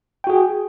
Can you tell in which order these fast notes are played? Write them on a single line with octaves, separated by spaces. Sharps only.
G5 F#4 G#4